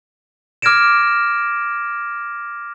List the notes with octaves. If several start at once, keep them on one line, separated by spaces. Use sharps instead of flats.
D6 F6 G#6 A#6 D7 E7